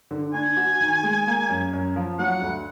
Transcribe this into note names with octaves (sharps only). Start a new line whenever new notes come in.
D3
D4 G#5
F#4
D#3
G#3
A#3
F#2
F#2
F3
F#3 F#5
D2